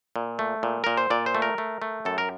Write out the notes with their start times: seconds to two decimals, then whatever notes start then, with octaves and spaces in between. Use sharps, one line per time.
0.16 A#2
0.39 A3
0.63 A#2
0.84 A#2 A#4
0.98 C5
1.10 A#2 D5
1.26 C5
1.35 A3
1.42 A#4
1.58 A3
1.82 A3
2.05 F#2 A4
2.18 A#4